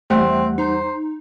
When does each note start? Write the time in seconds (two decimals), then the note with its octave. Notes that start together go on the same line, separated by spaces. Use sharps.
0.10 E2 G3 A3 C4 F#5
0.58 D#4 C5